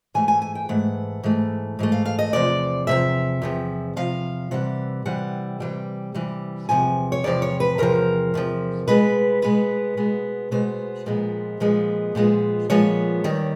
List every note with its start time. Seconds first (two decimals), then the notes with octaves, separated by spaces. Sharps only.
0.14 G#2 E3 A3 G#5
0.28 G#5
0.42 G#5
0.55 G5
0.69 G#2 E3 A3 F#5
1.23 G#2 E3 A3
1.79 G#2 E3 A3
1.92 F5
2.06 F5
2.19 D#5
2.33 E2 C3 F3 D5
2.87 E2 C3 F3 E5
3.42 E2 C3 F3
3.96 E2 C3 F3 F5
4.51 C3 E3 G3 F#5
5.05 C3 E3 G3 F#5
5.60 C3 E3 G3 G5
6.14 C3 E3 G3
6.69 E2 C3 F3 G#5
7.12 C#5
7.24 E2 C3 F3 D5
7.42 C#5
7.60 B4
7.78 E2 C3 F3 A#4
8.34 E2 C3 F3
8.87 B2 G#3 B3 B4
9.42 B2 G#3 B3 B4
9.97 B2 G#3 B3
10.51 B2 G#3 B3 C5
11.06 A#2 F3 G#3 B3
11.60 A#2 F3 G#3 B3
12.15 A#2 F3 G#3 B3
12.70 A#2 F3 G#3 B3 C#5
13.24 D#2 D#3 G3